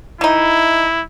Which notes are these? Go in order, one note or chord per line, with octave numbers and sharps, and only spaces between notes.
E3 D#4 E4